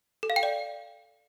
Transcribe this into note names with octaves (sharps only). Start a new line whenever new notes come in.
A4
F5
G5
D5